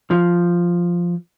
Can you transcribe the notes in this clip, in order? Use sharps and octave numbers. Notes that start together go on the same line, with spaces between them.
F3